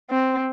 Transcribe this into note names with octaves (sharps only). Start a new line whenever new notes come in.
C4